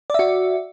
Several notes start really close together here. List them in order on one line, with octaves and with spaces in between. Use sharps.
D5 E5 F#4